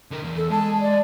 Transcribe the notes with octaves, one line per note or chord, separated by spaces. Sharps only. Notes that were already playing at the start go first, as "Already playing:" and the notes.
D3 A#4
E3 B3
A4
G#3 A5
D5